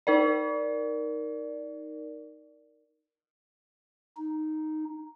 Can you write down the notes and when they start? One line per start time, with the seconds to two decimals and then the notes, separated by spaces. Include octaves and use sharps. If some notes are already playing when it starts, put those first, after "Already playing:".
0.07 D#4 A#4 D5
4.17 D#4